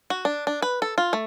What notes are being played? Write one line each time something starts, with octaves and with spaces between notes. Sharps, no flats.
F#4
D4
D4
B4
A4
F4
A3